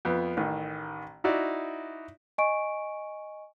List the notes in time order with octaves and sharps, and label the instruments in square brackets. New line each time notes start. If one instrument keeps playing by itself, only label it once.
[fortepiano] F2 B3
A1 D#3
D#4 E4 F#4 D5
[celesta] D#5 G#5 C#6 D7